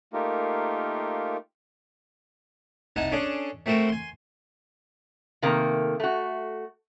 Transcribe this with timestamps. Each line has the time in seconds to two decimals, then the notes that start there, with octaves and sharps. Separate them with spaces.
0.13 A3 A#3 D#4 F4 G4 A#4
2.96 C2 D#4 F#5 G#5 A5
3.12 C#4 D4 G#4 A4
3.66 A3 C4 F#4 A4 A#4
3.89 G#5 C6
5.42 C3 D#3 A3 A#3
6.00 A3 F#4